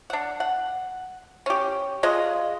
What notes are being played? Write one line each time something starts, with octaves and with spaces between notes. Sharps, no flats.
D4 F#5
F#5
C#4 G4
G#3 F4 D#5